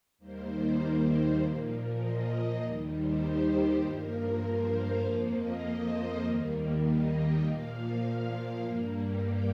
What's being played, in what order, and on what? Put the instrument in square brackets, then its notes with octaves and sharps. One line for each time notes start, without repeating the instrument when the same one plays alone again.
[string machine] D#2 D#3 G3 A#3 C5
A#2 F3 A#3
D#5
D#2 D#3 G3
C5
G4
G2 F3 A#3 A#4
C5
F5
F2 F3 A#3 F5
D#5
C5
D#2 D#3 G3 A#3
D#5
G5
A#2 F3 A#3 F5
G2 G3 A#3
G5